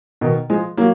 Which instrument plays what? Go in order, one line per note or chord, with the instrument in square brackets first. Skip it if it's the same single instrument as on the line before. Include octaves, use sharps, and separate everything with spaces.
[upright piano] B2 D#3
F3 G#3
F#3 A#3